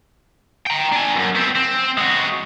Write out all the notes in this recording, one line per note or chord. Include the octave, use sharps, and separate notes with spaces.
G5 A#5
D4 G#5
C#2 F#2
B3 C4
C4
G#3 F#4